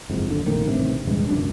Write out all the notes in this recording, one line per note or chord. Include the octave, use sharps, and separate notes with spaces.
F#1 F2 G#2
D#2 D3
F1 A#1 D#3 A#3
A1 G2 C3
D#1 E2 G2 G#3
C#2 F#2 B2 D4